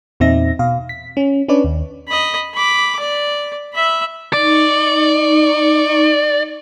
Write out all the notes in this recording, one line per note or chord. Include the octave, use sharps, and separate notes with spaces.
E2 A#2 C4 D#4 E5 A#6
B2 F5
B6
C#4
C#4 D4 B4 C#5 D5
D#2
D#5 B5
B5 D6
D5
E5 B5
D#4 D5 C#6